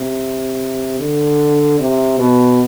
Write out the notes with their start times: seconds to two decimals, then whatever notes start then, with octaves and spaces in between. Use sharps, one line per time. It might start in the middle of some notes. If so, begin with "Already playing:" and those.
Already playing: C3
0.99 D3
1.80 C3
2.19 B2